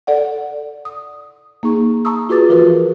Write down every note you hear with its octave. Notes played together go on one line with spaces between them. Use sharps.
A4 D5 F#5
D#6
A#3 D#4 G#4 C#6
A5 A#5 C#6 D#6 E6
F4 F#4 G#4 B4 D6 A6
E3 F3 F4 F#4 A#4 B4